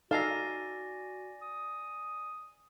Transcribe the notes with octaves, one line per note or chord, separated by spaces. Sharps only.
D#4 F#4 A4 D5 F5 G#5 A#6
D#6